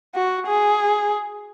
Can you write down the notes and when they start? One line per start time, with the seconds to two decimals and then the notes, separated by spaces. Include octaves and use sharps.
0.14 F#4
0.47 G#4